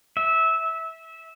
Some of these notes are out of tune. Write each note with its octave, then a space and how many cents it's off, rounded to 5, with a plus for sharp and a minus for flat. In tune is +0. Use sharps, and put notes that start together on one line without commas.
E5 -20